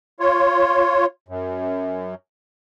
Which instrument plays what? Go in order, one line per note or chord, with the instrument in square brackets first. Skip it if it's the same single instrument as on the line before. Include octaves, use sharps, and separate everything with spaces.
[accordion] F4 C#5
F#2